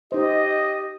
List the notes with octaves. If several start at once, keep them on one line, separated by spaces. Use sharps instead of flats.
D#4 G4 C5 D#5